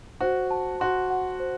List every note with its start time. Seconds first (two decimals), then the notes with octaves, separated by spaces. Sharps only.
0.21 F#4 C5
0.51 A5
0.80 F#4 C6
1.10 F#5
1.40 C5